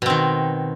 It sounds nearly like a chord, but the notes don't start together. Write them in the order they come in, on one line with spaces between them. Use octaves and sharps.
B2 C4 D#3